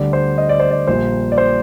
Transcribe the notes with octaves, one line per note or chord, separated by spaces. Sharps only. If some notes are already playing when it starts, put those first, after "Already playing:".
Already playing: D2 D3 G3 D5
C5
D#5
D5
C5
D5
A#1 A#2 G3 A#3 C5
D5
C5